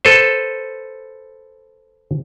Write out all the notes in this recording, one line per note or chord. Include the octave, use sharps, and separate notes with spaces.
A4 B4 C5